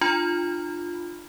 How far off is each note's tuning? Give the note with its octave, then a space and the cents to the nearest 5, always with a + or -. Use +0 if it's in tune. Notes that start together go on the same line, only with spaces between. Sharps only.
D4 +40 F4 +0 B5 +0